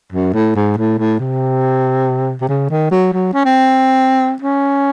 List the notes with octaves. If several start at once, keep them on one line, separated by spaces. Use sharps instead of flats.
F#2
A2
G#2
A2
A2
C3
C3
C#3
D#3
F#3
F#3
C#4
C4
C#4